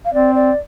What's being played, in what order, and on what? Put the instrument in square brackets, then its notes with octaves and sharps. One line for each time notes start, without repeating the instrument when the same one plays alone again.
[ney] F5
[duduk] C4 [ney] D5
[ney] D5